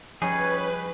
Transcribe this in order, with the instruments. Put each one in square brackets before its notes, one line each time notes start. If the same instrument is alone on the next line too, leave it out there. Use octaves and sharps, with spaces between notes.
[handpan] F3 [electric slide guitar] G3 D#4 G#4 [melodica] C#4 C#5 G#5 [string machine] B4